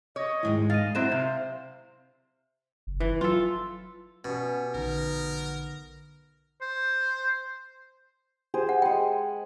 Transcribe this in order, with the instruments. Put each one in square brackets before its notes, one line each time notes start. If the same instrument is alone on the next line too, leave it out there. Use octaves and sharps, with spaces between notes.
[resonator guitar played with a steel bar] C#5 [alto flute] D#5
[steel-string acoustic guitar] D#2 G#2 G#3 [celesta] E4
[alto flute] D#5 [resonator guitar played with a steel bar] F5 [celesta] A6 D#7
[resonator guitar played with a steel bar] D3 F#3 C4 [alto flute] E4 [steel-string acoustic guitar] C5 [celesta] E5 E7
[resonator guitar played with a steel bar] C3 [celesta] E5 [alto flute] F5
[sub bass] F#1
[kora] E3
[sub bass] F#3 [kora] F4 A4
[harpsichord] B2 [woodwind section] G3 B3 C#4
[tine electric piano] A#1 D3 [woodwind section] B3 D#4 [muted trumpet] A#4
[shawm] C5
[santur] G4 G#4 C5
[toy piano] F#5
[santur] G#3 B5 [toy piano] G5